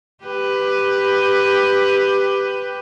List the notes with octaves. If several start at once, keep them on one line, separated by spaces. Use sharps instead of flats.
G4 B4